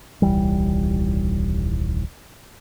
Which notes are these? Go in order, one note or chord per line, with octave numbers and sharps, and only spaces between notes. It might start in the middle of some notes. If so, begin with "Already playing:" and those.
D#1 C2 E3 G3